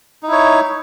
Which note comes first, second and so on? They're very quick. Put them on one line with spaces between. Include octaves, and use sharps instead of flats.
D#4 E4 C#5